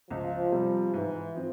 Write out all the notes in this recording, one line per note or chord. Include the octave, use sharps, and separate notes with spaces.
C#2 F3
C3 G3
G#2 E3
F3 C4